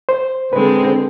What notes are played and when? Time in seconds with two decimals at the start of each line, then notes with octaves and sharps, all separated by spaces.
0.09 C5
0.53 D3 G#3 C4 B4